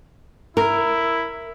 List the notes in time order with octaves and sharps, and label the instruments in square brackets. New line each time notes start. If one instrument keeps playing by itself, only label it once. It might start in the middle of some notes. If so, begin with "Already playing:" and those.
[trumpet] E4 [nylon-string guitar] A#4